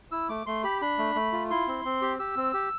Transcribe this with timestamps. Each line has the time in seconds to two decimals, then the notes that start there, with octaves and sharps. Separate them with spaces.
0.12 E4 E6
0.29 A3 D6
0.46 A3 C6
0.64 G4 B5
0.81 D4 B5
0.98 A3
1.15 A3
1.32 F4
1.50 E4 C6
1.67 C4
1.85 C4
2.02 G4
2.19 G4 E6
2.36 C4
2.54 G4